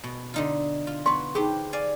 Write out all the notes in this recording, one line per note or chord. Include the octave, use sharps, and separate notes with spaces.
B2
D3 D#4 F4
F4
B3 B4 D5 C6 C#6
D#4 G4 G#4 B4 C5
D5 F5 G#5